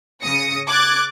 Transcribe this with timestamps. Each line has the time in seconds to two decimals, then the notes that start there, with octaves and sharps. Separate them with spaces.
0.23 C#3 D#6 A#6 C#7
0.68 D6 F#6 G#6 A6